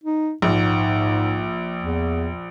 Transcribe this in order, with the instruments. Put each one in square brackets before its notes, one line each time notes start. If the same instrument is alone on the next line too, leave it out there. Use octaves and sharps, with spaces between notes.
[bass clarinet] D#4
[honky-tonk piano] A#1 [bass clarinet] G#2
[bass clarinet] E2